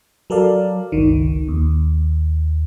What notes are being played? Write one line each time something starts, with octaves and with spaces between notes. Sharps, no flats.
F#3 A4 A#4 D5 F5
G1 C#2 D#3
D#2